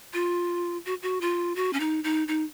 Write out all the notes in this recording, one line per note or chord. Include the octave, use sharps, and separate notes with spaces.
F4
F#4
F#4
F4
F#4
C#4
D#4
D#4
D#4